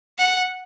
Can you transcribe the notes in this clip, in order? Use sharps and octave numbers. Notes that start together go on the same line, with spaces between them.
F#5